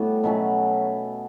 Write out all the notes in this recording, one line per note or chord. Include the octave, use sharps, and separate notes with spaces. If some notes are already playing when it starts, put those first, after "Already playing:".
Already playing: A2 G3 B3 F#4
B2 F#3 A3 C#4